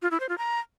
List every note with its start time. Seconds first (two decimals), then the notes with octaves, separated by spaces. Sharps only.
0.02 F4
0.11 E4
0.20 C5
0.29 F4
0.38 A#5